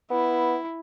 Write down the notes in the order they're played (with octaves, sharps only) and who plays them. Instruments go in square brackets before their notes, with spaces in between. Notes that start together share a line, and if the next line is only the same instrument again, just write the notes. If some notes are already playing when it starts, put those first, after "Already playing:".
[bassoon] B3 [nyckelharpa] E4